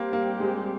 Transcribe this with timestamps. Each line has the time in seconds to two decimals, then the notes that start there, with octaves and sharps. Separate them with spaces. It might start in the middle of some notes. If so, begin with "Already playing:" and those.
Already playing: G3 A#3 C4 G4
0.13 A#3
0.40 G#3